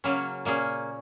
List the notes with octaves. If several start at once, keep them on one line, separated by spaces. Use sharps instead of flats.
C#3 F#3 A#3 C#4
A#2 A#3 C#4 G#4